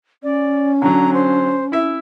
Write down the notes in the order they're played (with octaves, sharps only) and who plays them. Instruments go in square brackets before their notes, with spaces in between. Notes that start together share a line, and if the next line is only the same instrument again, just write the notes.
[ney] C#4 [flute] D5
[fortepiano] D3 F#3 [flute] A#5
[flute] C5
[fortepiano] E4 E5